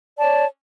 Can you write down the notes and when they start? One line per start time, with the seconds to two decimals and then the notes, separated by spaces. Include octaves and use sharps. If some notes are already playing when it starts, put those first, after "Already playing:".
0.16 D5
0.19 A5
0.22 C#5